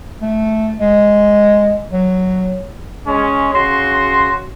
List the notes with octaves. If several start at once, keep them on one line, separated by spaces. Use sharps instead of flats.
A3
G#3
F#3
G#3 C#4
C#3 F#4 C6